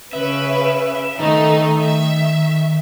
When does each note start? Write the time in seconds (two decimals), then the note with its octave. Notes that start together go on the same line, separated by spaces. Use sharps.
0.13 C#3 B4 E5
1.20 D#3 A3 D#4
1.79 E5